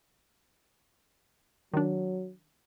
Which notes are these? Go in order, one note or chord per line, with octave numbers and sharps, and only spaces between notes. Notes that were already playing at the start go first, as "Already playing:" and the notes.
D#3 F#3 D4